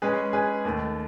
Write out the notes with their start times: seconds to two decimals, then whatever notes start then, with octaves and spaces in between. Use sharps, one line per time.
0.02 G#3 C#4 G#4 B4
0.33 G#3 C#4 G#4 B4
0.65 D#2 D#3 A3